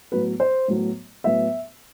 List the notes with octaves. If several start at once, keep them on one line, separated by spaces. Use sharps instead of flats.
A2 F#3 B3 B4
C5
A2 F#3 B3
A2 F#3 B3 E5